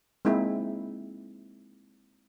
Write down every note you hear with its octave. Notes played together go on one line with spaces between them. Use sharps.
G#3 A#3 C4 D#4 E4